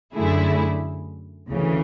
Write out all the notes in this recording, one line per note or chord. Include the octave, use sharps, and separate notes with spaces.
F#2 D3 A3 E4 G#4
D2 C#3 E3